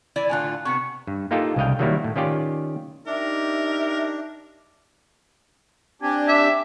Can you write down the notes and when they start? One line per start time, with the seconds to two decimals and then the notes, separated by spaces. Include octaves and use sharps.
0.16 E3 E4 D5
0.30 A2 D3 F4 G#5 F#6
0.65 C3 B3 C#6 C#7
1.07 G2
1.31 A#3 D#4 F4 G4 A4
1.56 C2 C#3 G#3 D#5 F5 G5
1.79 D#3 F#3 G3 A#3 E4
2.04 A2
2.16 D#3 C#4 F4 G4 D5
3.07 D4 D#4 G4 A#4 E5
6.02 C4 D4 G4 G#5
6.28 E5 D6